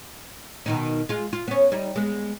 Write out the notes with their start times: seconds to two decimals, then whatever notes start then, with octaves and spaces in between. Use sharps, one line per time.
0.66 B2 D#3 D#4
1.09 G#3 F4
1.33 F4
1.48 B3 C#4
1.72 G3 D#4
1.96 G#3 B3